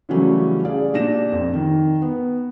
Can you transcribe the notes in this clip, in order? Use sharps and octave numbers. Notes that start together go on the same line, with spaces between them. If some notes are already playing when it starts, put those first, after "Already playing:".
C#3 E3 F#3 G3 A3 C#4
G#4 D5 F5
A#2 D4 G4 A#6 E7
F2
D#3
B3